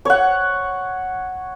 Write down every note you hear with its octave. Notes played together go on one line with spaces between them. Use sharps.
C#5 F#5